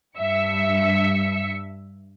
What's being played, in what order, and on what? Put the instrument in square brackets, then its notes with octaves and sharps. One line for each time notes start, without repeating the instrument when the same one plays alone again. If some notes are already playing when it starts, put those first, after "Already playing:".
[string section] G2 E5 C#7